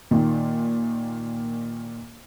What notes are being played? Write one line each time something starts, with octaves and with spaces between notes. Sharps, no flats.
A#2 D#3